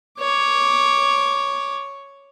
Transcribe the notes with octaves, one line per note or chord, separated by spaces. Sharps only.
C#5 D6